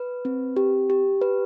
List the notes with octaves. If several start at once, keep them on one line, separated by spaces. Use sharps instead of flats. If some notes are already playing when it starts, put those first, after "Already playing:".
Already playing: B4
C4
G4
G4
B4